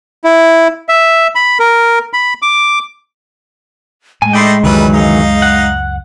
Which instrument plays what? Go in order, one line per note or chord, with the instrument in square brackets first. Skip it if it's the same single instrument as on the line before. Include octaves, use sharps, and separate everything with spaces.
[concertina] E4
E5
B5
A#4
B5
D6
[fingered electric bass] A2 [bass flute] G#3 [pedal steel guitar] G#5
[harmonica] A3 D4 D#4 [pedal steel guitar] G5 B5 C6
[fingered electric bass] C#2 F#2 [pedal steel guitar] D#3 E3 F#3 [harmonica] G3 B4
[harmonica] D#4 F5
[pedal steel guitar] F#5